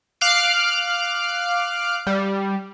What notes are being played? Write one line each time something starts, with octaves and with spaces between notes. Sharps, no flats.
F5 D6 F6 F#6 C7 D7
G3